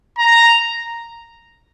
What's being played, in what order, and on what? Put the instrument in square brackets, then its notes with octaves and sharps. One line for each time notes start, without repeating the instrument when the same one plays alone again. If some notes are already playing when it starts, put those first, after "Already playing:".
[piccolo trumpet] A#5